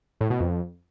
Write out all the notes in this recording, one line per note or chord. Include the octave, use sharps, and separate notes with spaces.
A2
B2
F2